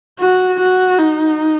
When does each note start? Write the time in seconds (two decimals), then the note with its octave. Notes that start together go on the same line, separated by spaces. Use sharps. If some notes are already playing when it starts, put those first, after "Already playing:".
0.20 F#4
0.60 F#4
0.99 D#4